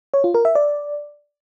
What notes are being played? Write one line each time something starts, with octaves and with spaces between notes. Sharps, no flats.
C#5
F4
A#4
E5
D5